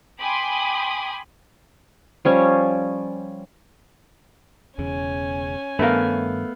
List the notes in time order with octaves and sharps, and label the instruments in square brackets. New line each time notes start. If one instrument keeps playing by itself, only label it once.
[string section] G5 G#5 B5 C6 D6 D#6
[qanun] F3 G3 C#4
[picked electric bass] E1 E2 C#3 [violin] C#4 G#5
[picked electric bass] G2 D#3 D4 [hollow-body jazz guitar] A3 A#4 [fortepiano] B3 F5